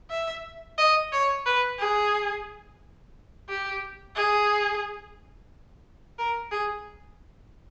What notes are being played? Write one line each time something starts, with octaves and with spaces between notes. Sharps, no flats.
E5
D#5
C#5
B4
G#4
G4
G#4
A#4
G#4